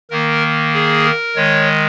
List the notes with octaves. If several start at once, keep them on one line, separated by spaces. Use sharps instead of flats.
D#3 A#3 A#4
G#4
A#4
D#3 G#3 C#5